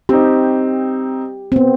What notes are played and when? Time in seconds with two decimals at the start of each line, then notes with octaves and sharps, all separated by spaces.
0.09 C4 D#4 G4
1.52 B3 C4